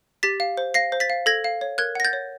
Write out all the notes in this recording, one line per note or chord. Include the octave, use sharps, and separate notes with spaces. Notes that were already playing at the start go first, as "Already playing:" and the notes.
G4 A6 B6
F5
C5
F5 A#6 C7
C5
A6 B6
F5
A4 G#6 A#6
F5
C#5
A#4 F#6 G#6
F#5 A#6
G6 A6
C#5